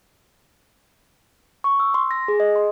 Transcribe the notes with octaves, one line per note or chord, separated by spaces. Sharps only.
C#6
E6
C6
A#6
G#4
D#5
C6